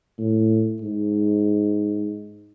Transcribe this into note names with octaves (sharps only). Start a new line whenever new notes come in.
A2
G#2